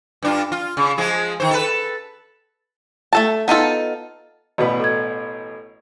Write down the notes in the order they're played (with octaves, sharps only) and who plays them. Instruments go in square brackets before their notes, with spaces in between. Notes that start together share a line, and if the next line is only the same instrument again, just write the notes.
[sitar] G2 D4 F4
F4
C#3
F3 G#3 G#4
D#3 C5
A4 B4
[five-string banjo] A3 A4 A5
B3 D#4 F4 A4
[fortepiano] A1 B2 B4 [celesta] F#4 D5 D#5
[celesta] A4 D#5 G#6